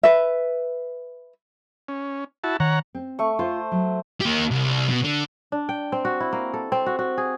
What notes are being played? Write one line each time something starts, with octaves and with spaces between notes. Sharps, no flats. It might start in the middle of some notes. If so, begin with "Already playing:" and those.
B4 E5
C#4
E4 F#4 A5
D#3 C#5 F#5 A#5
C4
A3 C#6
F4 C5
F#3
A#3 G4
C2
B2
D3
D4
G5
C4
F#4
E4
A#3
A4
C4
F#4
F#4
G#4